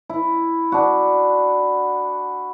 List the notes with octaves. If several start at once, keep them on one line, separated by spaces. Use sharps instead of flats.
E4
D4 F#4